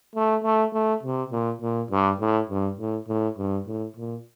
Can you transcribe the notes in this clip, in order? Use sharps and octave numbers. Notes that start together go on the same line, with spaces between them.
A3
A3
A3
C3
A#2
A#2
G2
A2
G2
A2
A2
G2
A2
A#2